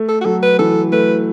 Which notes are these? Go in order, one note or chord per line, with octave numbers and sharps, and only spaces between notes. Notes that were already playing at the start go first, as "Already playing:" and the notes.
Already playing: A3
A4
F#4
F#3 A4
B4
E3 A4
A3 B4